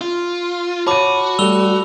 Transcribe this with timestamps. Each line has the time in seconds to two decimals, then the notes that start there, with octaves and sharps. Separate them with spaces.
0.01 F4
0.87 F#4 C#5 A5 B5 D6 D#7
1.39 G3 A3 E6 F7 G7